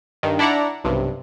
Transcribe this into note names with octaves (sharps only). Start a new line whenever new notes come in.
G2 D#3
D4 E4 D5 F#5 A#5
B1 G2 C3